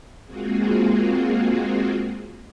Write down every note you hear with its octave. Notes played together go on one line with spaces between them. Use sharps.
G#3 A#3 C4 F4 F#4 G#4